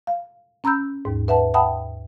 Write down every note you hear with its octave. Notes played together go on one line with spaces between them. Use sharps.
F5
C#4 A#5 B5 E6 G6
D#2 G#2
B4 E5 F#5 A5
E5 F#5 G5 A5 B5 D#6